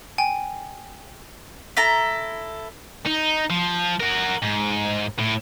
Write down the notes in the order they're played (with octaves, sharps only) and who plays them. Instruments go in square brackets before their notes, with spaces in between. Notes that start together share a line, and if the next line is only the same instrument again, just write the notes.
[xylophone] G5 G#5
[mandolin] E4 A4 A#5
[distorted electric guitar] D#4
F3
F#4 A#4
G#2
A2